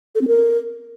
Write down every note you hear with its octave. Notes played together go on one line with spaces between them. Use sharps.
A4
C4
A#4